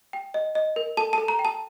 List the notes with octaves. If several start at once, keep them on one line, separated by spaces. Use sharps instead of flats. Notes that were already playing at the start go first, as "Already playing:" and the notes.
G5
D#5
D#5
A#4
A4 A5
A4 A5
A#5
G5
A5